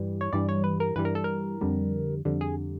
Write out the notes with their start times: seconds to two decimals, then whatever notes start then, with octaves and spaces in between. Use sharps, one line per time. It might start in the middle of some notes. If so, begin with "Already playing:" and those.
Already playing: G2 E3 G3
0.21 C#5
0.33 G2 E3 G3 D5
0.49 C#5
0.64 B4
0.80 A#4
0.96 G2 E3 G3 B4
1.05 A#4
1.15 A4
1.24 A#4
1.61 F2 D3 G3
2.25 F2 D3 G3
2.41 G#4